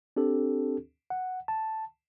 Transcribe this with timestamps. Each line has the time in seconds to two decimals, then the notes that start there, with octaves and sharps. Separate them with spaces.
0.17 C4 D4 G4 A4
1.10 F#5
1.48 A5